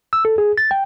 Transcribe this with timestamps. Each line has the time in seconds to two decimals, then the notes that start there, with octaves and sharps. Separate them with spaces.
0.13 E6
0.25 A4
0.38 G#4
0.58 A6
0.71 G5